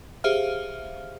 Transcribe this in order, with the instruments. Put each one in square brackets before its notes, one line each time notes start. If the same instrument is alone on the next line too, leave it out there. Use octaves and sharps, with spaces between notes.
[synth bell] G4 G#4 C5 E5 F5 F6